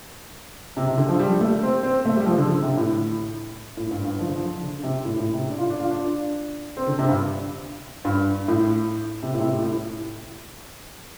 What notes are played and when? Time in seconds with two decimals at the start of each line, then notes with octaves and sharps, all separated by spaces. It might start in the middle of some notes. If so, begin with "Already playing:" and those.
0.77 C3
0.87 C3
0.97 D3
1.09 F3
1.19 G3
1.41 A3
1.63 C4
1.83 C4
2.05 A3
2.16 G3
2.26 F3
2.38 D3
2.49 D3
2.62 C3
2.77 A2
3.77 A2
3.91 G2
4.05 G2
4.19 F3
4.28 D3
4.35 F3
4.62 D3
4.83 C3
5.05 A2
5.19 A2
5.34 C3
5.49 D4
5.58 F4
5.70 D4
5.80 F4
5.91 D4
6.77 C4
6.87 D3
6.99 C3
7.08 G2
8.05 G2
8.48 A2
9.23 C3
9.34 A2
9.41 C3
9.48 A2
9.62 A2